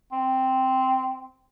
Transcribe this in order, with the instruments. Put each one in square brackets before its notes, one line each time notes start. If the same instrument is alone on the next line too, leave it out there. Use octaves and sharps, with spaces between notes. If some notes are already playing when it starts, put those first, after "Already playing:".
[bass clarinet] C4